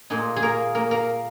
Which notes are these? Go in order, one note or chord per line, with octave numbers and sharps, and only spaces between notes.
A#2 A#3 D#4 G#4
G#4
A#3 A#4
A#3 A#4
A#3 A#4